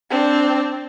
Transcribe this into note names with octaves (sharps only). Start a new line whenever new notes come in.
C4 D4